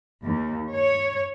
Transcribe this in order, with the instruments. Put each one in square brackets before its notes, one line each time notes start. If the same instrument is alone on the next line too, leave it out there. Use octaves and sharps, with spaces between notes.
[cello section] D#2
C#5